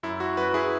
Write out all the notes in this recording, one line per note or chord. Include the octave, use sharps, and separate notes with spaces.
F#2 E4
F#4
F#2 F#4 B4
E4 G#4